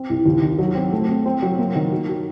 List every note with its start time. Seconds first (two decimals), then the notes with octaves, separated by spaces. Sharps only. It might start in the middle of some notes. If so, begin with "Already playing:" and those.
Already playing: C4
0.09 C2
0.26 D#2
0.42 D#3
0.58 F#3
0.75 C4
0.92 A3
1.08 C4
1.26 C4
1.42 F#3
1.58 A#3
1.75 D#3
1.92 F#4
2.09 F#4